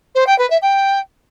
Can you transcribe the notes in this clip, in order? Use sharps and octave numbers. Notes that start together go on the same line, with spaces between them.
C5
G5
B4
E5
G5